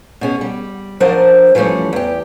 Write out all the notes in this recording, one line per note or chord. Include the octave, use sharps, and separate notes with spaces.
B2 C#4 G#4
G3
F3 F#3 D4 A#4 C5 D#5
E3 F3 G3 A3 C#4
E2 G4